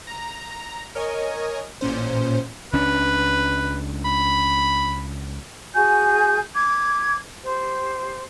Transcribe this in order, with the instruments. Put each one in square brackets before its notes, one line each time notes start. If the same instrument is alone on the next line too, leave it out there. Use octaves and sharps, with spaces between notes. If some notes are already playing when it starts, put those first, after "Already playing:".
[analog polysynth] A#5
A#4 C#5 D#5 G#5
A1 A#2 C#4 C5
[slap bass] C#2 C#4 D4 [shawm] B4
[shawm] B5
[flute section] F#4 G#4 G#5 G6
D6 G#6
G4 C5